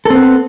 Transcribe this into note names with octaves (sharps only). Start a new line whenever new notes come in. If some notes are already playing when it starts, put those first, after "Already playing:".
B3 C4 A4